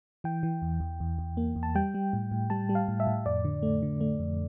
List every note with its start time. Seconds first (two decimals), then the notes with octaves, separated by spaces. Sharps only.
0.24 E3 G5
0.43 E3
0.62 E2
0.80 E2
1.00 E2
1.19 E2
1.37 A#3
1.56 E2
1.63 A5
1.75 G3 G5
1.94 G3
2.13 A2
2.32 A2
2.50 G3 A5
2.69 G3
2.75 F5
2.88 A2
3.00 E5
3.07 A2
3.26 F2 D5
3.45 D3
3.63 A3
3.82 D3
4.01 A3
4.20 F2